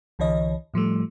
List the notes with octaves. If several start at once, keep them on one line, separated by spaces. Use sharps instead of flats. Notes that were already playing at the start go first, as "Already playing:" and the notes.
C2 D3 E3 C#5 D#5
A2 F3 G3 A3